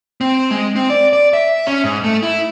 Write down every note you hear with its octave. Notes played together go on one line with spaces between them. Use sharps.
C4
G#3
C4
D5
D5
E5
C#4
G#2
A3
E4